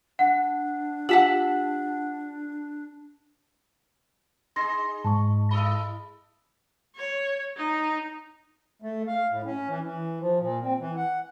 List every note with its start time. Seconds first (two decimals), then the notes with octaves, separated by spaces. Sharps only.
0.19 D4 F#5
1.09 F4 G4 F#5 A5 E6 B6 F#7
4.56 D#4 G#4 C6 A#6
5.05 G#2 A5 C#6
5.51 E4 A4 D#5 B5 E6
6.96 C#5
7.57 D#4
8.82 A3
9.07 F5
9.31 A2
9.45 C#4
9.69 E3
9.84 E3
10.20 F3
10.41 A#2
10.63 C4
10.80 E3
10.97 F#5